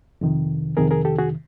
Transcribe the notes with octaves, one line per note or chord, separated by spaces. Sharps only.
F2 C3 D#3
F2 C3 D#3 G#4 A#4
G#4 A#4
G4 A4
F#4 G#4